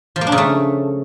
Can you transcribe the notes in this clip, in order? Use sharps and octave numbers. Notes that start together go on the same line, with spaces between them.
F3
A#3
D4
C#3
A3